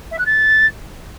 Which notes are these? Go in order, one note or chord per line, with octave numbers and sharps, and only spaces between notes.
E5
F#6
A6